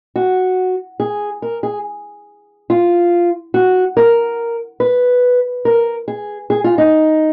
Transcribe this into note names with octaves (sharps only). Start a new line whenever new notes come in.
F#4
G#4
A#4
G#4
F4
F#4
A#4
B4
A#4
G#4
G#4
F4
D#4